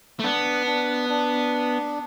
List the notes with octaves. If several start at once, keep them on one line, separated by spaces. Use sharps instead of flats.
A3
B3 D4
D4
D4